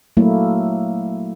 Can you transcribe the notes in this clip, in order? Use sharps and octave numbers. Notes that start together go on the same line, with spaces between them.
F#3 A3 A#3 E4